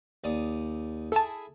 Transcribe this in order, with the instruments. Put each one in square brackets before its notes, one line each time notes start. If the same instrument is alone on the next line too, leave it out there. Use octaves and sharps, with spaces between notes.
[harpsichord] D#2 D5 D#6
[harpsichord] E4 G#4 [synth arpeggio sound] A4 A5